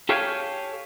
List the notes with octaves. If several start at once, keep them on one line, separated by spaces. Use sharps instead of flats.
G4 A4 C#5 F5 G5 G#5